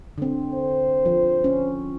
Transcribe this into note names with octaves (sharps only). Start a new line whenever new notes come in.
D3 C4
C5
F3
C#4